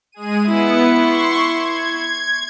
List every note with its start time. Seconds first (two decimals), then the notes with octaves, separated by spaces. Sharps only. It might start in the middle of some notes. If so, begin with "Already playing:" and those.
0.12 G#3 G#4 D#7
0.48 B3 E4 C#7
0.91 C6 C#6
1.47 G#6